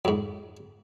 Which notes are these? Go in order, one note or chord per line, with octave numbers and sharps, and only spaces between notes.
F2 G#2